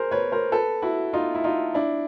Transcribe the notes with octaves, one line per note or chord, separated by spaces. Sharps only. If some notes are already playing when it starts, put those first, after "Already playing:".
Already playing: G#4 A#4 C5
B4 C#5
A#4 C5
A4 B4
E4 F#4
D#4 F4
E4
D#4 F4
D4 E4